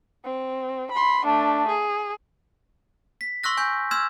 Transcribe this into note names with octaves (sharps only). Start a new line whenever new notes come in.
C4
B5 C6
A3 D4
G#4
B6
C6 C#6 E6 F#6 A#6
G#5 C#6 G6
C6 E6 F6 G#6 E7